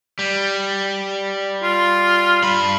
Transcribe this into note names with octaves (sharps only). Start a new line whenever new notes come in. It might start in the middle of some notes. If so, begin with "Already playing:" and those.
G3
F4
G2 B5